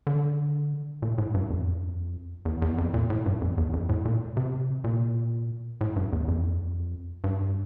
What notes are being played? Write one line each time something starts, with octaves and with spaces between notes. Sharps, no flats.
D3
A#2
A2
G2
F2
E2
E2
F2
A#2
A2
G2
F2
E2
F2
A2
A#2
C3
A#2
A2
G2
E2
F2
G2